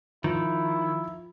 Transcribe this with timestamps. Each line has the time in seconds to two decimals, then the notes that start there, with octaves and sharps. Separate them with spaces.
0.24 D#3 F3 E4